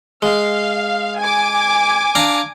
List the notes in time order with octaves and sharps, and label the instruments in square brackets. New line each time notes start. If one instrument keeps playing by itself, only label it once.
[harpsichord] G#3 [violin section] F5
[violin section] G#5 D6
[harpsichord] D4 F5 A#5